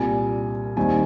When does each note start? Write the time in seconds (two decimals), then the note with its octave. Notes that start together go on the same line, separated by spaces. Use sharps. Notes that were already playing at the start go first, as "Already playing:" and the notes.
Already playing: C2 A#2 G3 G#5
0.77 D#2 D#3 G3 C4 D#4 G#5